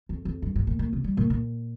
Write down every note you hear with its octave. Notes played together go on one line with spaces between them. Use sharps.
F2
F2
G2
G#2
A#2
A#2
C3
G3
A#2
A#2